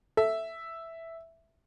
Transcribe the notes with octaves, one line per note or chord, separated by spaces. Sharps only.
A4 E5